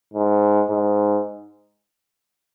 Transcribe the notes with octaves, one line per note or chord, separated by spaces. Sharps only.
G#2
G#2